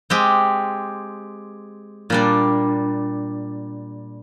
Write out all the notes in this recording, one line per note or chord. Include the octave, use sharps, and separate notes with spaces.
G#3 C4 G4
A#2 G3 D4